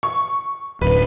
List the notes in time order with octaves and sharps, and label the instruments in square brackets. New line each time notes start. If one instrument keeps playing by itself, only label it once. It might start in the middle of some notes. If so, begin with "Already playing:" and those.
[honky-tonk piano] C#6
[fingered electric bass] D1 F#2 [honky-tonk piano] B4